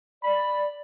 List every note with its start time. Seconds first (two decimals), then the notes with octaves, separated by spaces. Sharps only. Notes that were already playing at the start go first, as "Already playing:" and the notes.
0.23 D5 B5